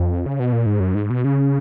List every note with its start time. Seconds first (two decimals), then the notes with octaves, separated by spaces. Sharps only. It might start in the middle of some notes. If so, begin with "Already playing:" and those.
Already playing: F2
0.26 C#3
0.40 B2
0.53 A#2
0.66 G#2
0.80 F#2
0.95 G#2
1.10 B2
1.25 C#3